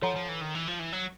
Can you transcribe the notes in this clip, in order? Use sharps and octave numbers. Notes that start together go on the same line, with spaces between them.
F3 A4 C#5 F#5 A#5
F3
E3
D#3
E3
F3
E3
F#3